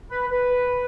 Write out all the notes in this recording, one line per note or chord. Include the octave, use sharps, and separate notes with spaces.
B4
B4